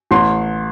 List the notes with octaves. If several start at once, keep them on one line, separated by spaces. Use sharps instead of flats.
A1 C6